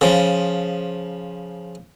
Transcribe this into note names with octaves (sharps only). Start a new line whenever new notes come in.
C#3 F3